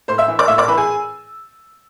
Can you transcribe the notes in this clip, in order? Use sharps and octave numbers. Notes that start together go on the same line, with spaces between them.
A2 C5 C6
E5 E6
E3
D5 D6
A2 E5 E6
D5 D6
E3 B4 B5
G#4 G#5